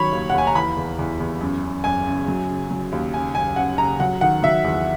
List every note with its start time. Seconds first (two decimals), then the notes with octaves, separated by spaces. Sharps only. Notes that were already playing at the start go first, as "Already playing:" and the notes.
Already playing: D#3 F#3 C#5 B5
0.12 D#2
0.30 F#5
0.34 D#2 G#5
0.47 A#5
0.55 E3 B5
0.77 E2
0.99 E2
1.20 E2
1.41 F#2
1.63 F#2
1.84 F#2 G#5
2.07 C#3
2.28 F#3
2.49 C#3
2.71 F#3
2.92 D#2
3.14 C#3 G#5
3.35 F#2 G#5
3.56 C#3 F#5
3.78 C#3 A#5
4.00 F#3 F#5
4.21 D#3 F#5
4.42 F#3 E5
4.64 E2